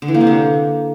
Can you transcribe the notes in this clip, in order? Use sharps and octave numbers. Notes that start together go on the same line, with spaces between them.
D3
E3
A#3
C3
D3